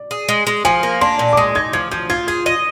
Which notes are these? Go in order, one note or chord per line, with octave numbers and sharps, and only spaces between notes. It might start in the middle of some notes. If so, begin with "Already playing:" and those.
Already playing: D5
G#4
G#3
G#3
F3 G#5
A#3
D4 C6
A#2
D6
G#3 D#6
D#4 G#6
F3 G#6
F3 G6
F4 G#6
G#4 G#6
D#5 A#6